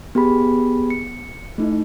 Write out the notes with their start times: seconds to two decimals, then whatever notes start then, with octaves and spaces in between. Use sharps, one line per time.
0.15 B3 G4 G#4 B5
0.90 C#7
1.58 A3 D#4 E4